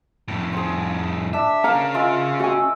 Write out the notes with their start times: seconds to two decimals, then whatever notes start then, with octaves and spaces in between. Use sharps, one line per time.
0.28 F2 A2
0.53 G#4 C5
1.33 D4 D5 E5
1.64 C#4 G#4 A#4 F5 A#5
1.94 G#3 F4 E5
2.40 F#4 E5 G#5 E6